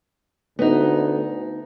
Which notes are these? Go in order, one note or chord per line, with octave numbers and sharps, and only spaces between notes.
D2 B3 D#4